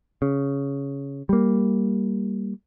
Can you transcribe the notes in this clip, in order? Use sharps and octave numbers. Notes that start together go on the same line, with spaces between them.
C#3
G3 A#3